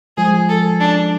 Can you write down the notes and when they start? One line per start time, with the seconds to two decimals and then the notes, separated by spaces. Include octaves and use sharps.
0.17 F3 G#3 G#4
0.49 A4
0.81 D4